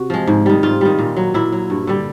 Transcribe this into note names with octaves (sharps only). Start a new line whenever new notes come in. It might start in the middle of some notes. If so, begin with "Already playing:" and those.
Already playing: C3 F#4
F3 G#3
G#2
D#3 G3
G#2 F4
D#3 G3
A#2
F#3
A#2 E4
F#3
G2
D3 G3